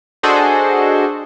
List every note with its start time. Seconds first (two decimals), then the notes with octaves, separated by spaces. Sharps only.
0.23 D4 F#4 G#4 A4 C5 D#5